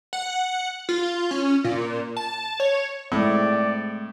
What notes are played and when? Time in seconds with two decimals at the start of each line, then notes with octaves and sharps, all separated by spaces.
0.13 F#5
0.89 F4
1.31 C#4
1.64 A#2
2.17 A5
2.60 C#5
3.12 A2 G#3 C4 D5